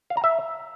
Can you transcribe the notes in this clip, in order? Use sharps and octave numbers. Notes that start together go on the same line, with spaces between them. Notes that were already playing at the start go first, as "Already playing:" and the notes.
F5
A#5
E5